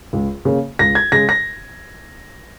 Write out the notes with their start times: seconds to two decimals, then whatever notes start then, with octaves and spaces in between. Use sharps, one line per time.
0.13 C#2
0.45 C#3 A#3
0.79 C#2 A#6
0.95 G#6
1.12 C#3 G#3 A#6
1.29 A#6